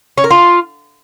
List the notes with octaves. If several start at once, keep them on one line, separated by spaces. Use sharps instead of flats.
C#4
A#4
F4